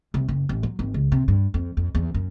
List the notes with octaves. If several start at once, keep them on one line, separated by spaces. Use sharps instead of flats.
C2
F#1
A1
F#3
G#1
C#2
C3
G2
F2
F2
E2
F#2